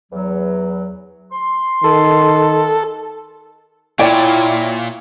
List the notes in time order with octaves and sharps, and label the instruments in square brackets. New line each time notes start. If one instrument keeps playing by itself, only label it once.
[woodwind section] E2 F#3
C6
[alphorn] D#3 [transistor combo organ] A4
[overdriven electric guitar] A#2 [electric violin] E4 F4 [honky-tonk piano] C#5 D5 [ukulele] G5